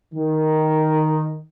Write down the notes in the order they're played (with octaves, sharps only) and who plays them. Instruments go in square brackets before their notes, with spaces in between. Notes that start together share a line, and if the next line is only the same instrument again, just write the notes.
[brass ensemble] D#3